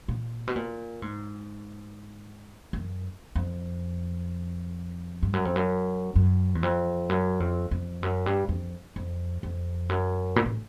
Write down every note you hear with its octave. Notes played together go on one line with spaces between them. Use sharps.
A#2
B2
A#2
G#2
F#2
F2
G2
F#2
F2
F#2
F#2
E2
F2
F#2
F2
F2
F#2
G2
F2
F2
F2
F#2
A#2
A2